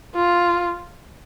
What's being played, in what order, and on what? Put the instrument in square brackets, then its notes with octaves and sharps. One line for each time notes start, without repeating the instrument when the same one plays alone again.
[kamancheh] F4